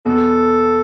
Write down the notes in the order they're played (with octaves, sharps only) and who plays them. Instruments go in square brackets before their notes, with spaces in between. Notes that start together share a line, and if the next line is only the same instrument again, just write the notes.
[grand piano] E2 B2 B3 [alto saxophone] A4